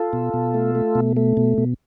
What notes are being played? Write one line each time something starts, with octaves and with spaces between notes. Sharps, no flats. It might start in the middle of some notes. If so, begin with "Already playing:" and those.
Already playing: F4 A4
B2
B2
A3
A3
B2
A3
B2
B2